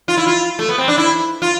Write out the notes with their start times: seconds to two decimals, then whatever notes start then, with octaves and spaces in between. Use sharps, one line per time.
0.08 F4
0.17 E4
0.27 F4
0.59 A3
0.69 B3
0.78 C4
0.88 D4
0.98 E4
1.42 F4